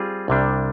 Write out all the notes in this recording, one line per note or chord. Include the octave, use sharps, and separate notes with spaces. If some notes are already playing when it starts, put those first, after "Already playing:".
Already playing: G3 C4 F4 G#4
C2 C3 G3 D4